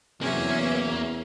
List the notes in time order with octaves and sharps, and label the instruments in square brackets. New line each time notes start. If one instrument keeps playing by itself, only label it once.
[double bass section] E2 [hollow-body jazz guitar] C3 F#3 [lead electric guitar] A#3 [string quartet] C#4 G#4 E5